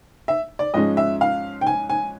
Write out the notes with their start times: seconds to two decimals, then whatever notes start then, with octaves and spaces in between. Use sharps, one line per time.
0.28 E5
0.59 D5
0.74 G#2 F3 G#3 C#4 D#5
0.97 E5
1.21 F5
1.61 G5
1.67 G#5
1.90 G#5